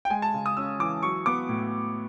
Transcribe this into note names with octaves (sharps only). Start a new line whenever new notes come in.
G5
G#3 G#5
A5
C#3
D#6
C#4 E6
E3 D6
F#3 C#6
B3 D6
A2